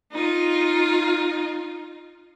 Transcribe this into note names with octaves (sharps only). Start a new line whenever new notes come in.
D#4 F4